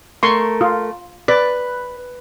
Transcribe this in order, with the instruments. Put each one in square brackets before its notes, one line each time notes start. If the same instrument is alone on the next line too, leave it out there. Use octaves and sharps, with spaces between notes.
[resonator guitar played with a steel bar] A3 A#4 [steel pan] C6 C#6
[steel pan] F4
[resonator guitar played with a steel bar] B4 [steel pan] D5